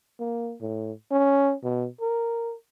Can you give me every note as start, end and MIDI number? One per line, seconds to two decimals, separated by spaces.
0.20 0.56 58
0.61 0.92 45
1.11 1.54 61
1.63 1.88 47
2.01 2.54 70